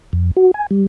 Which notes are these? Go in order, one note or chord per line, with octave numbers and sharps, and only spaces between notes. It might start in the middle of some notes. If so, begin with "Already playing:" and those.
F2
F#4
G#5
G3